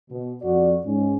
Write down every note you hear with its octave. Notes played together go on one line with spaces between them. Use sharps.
B2
F2 F#4 D5
G#2 C#4